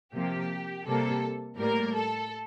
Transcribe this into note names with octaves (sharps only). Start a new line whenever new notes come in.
C3 F3 A#3 G4
C3 G3 A#3 A4
A2 G3 A#3 A#4
A4